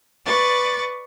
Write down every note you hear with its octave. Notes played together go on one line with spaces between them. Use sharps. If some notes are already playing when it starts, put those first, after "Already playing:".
B4 D5 C#6 A6